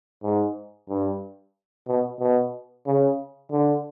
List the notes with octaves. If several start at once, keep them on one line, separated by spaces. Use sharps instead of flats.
G#2
G2
B2
B2
C#3
D3